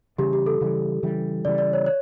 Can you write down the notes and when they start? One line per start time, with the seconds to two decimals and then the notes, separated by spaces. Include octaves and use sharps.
0.18 C#3 E3 G3 G4
0.33 G4
0.46 A4
0.61 C#3 E3 G3
1.03 C#3 E3 G3
1.45 C#3 E3 G3 D5
1.58 D5
1.73 C#5
1.86 C#5